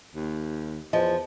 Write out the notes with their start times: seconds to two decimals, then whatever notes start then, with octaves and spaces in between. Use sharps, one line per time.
0.15 D#2
0.93 E2 F3 D#5